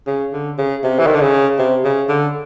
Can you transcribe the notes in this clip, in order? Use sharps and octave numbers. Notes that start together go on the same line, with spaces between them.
C#3
D3
C#3
C3
E3
D#3
D3
C#3
C3
C#3
D3